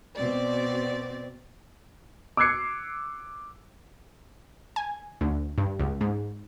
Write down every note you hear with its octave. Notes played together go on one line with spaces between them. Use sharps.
B2 C4 D5
D6 E6 F#6 G#6 C7 C#7
G#5
D2
G2
C#2
G#2